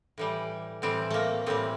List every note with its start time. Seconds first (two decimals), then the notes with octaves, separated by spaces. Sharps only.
0.18 A2 E3 G3
0.82 A2 E3 G3 C4
1.10 A3 A#3
1.46 A2 E3 G3 C4